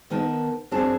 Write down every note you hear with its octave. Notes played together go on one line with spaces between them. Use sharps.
D#3 B3 D#4 A#4 A5
F#2 C4 D4 G#4 A5